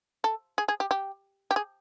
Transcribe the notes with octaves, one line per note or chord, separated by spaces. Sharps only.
A4
G#4
G#4
G4
G4
G4
G#4